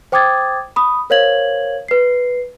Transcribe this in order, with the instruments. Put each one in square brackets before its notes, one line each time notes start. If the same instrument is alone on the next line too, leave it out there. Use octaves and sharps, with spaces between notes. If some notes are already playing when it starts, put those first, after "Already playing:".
[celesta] C5 G5 D6 D#6 G#6 A6
B5 D#6
A#4 C5 C#5 F5 G#6 F#7
B4 C7